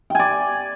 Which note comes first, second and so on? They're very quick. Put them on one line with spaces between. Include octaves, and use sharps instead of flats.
G5 G#5 D5